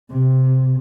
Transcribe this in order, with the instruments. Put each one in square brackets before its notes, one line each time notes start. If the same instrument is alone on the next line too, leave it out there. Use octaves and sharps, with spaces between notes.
[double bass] C3